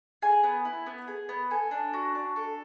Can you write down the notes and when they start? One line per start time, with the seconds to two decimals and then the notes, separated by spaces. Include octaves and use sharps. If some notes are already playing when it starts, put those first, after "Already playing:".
0.22 G#4 G#5
0.44 B3
0.65 E4
0.87 B3
1.08 G#4
1.29 B3
1.50 A4 G#5
1.71 D4
1.93 F#4
2.15 D4
2.36 A4